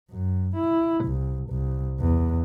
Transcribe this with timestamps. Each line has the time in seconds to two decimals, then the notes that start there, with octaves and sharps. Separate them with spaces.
0.11 F#2
0.56 E4
1.05 C2
1.51 C2
2.00 E2